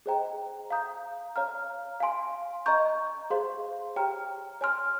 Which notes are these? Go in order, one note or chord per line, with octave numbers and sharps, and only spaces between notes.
G#4 C5 D#5 G5 A#5
F5 A#5 D#6 G6
C#5 F5 A#5 F6
F5 G#5 C6
D#5 A#5 C#6 G6
G#4 C5 F5 C6
G4 C#5 G5 A#5 F6
C#5 G#5 C6 F6